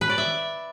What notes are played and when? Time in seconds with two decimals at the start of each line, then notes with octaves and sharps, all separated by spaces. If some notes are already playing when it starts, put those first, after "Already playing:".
0.01 B4
0.10 D5
0.18 E5